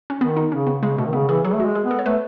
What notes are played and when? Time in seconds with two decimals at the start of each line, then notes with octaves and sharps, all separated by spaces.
0.10 C#4
0.21 D#3 B3
0.37 D#4
0.52 C#3 C#4
0.67 B3
0.82 C#3 G#3
0.97 B2 A3
1.06 D#3
1.13 C#3 B3
1.28 E3 G#4
1.44 F#3 G#4
1.54 A3
1.60 F#4
1.65 G#3
1.75 G#4
1.84 B3
1.91 A4
1.99 C#5
2.06 A3 B4